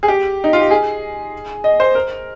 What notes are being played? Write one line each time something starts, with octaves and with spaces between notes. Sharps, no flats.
G#4
G4
D#4
F4
G4
G#4
D#5
C5
A#4